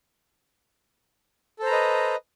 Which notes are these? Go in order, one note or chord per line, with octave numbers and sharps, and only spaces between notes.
A4 B4 C5 D#5 A#5